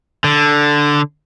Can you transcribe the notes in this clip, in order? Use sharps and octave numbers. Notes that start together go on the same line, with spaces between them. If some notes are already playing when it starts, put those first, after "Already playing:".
D3